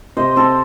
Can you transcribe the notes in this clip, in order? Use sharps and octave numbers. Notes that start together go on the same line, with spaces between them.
C3 C5 D#5
C4 A4 C5